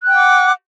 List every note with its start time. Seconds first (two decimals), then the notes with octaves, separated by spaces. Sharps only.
0.02 F#6
0.06 G5
0.11 F#5
0.15 D6